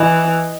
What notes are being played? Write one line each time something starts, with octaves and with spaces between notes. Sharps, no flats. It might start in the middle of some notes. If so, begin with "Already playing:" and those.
Already playing: E3 D#5